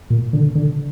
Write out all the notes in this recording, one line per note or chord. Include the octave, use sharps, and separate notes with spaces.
A#2
D3
D3